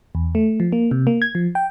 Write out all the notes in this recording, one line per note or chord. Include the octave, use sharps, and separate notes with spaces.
E2
A3
F3
A#3
C3
A#3
G#6
F3
G5